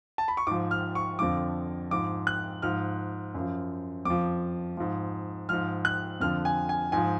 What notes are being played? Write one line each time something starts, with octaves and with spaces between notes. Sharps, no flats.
A5
B5
C#6
G#2 F3 D6
F6
C#6
F2 D3 F3 D6
G#2 F3 D6
F#6
G#2 F3 F6
F#2 F3
F2 F3 D6
G#2 F3
G#2 F3 F6
F#6
F2 D3 F3 F6
G#5
G#5
G#2 F3 G#5